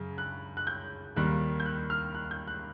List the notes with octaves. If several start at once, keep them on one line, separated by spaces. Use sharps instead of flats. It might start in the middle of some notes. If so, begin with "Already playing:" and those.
Already playing: F#2 C#3
F#6
F#6
G6
D#2 D#3 G3 A#3 F#6
G6
F#6
F6
F#6
G6
F#6